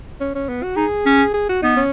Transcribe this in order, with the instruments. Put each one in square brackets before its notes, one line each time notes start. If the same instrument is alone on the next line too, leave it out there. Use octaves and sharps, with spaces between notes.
[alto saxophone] C#4
C#4
B3
F#4
[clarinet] D#4 [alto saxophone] G#4
[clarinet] C#4
[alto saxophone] G#4
F#4
[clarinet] B3 [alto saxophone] D#4
[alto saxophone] C#4